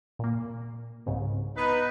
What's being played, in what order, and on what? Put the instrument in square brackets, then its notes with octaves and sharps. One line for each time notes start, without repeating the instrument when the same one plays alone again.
[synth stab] A#2 A#3
C2 G#2 C#3
[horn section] B3 D#4 [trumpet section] B4